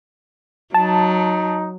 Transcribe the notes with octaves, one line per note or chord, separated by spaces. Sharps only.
F#3 D#4 A5